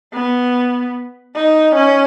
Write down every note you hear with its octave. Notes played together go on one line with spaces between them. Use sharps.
B3
D#4
C#4